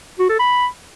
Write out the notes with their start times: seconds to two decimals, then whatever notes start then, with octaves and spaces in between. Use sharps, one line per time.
0.19 F#4
0.29 A4
0.39 B5